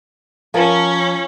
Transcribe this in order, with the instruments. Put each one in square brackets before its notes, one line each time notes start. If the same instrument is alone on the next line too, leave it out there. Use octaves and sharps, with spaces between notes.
[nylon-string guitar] F3 A#4 G#5 [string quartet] C#4